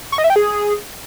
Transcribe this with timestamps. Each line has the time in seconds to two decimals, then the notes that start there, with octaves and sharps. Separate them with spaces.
0.12 C#6
0.18 D#5
0.24 E5
0.30 G5
0.36 G#4